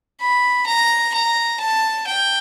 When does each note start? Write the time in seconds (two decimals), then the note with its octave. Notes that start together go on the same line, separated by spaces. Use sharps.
0.21 B5
0.67 A#5
1.14 A#5
1.60 A5
2.07 G5